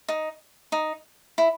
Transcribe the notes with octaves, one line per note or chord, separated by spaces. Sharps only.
D#4
D#4
E4